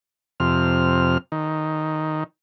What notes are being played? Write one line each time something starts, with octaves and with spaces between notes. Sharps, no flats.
F2 C3 F6
D#3